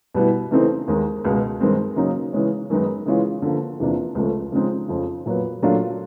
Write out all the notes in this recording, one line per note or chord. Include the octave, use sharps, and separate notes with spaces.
B2 G3 B3 E4
C#3 E3 A3 C4 D#4
D#2 D#3 G#3
C#2 B2 G#3
G2 D#3 G#3 C4
C#3 F#3 A#3 D#4
C#3 E3 G#3 C#4
F#2 D#3 G#3 B3 D#4
C#3 E3 G#3 C#4 F4
D3 F3 A#3
E2 C3 F3 A#3 D4
C#2 C#3 F3 A3
C#3 F3 G#3 C4 D#4
F2 C#3 F3
A#2 F#3 B3
A#2 F#3 A3 D4 F4